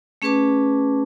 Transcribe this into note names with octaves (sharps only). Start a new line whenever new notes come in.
A3 C#4 G#4 B4 A5 D6